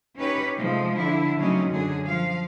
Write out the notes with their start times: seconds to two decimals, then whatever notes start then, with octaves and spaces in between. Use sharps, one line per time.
0.16 C#4 D#4 G4 B4 C#5
0.57 C3 F3 G#3 A3
0.97 D3 D4 E4
1.39 C#3 F#3 A3 C4 C#4 D#4
1.70 F#2 D3 F#3 D4 G#4
2.06 F3 F5